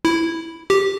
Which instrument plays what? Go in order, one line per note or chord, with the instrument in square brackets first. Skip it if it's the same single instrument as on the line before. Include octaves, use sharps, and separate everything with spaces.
[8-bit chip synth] E4
G4